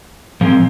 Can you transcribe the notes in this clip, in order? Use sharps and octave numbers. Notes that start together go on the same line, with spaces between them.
A#2 F3 G#3 C4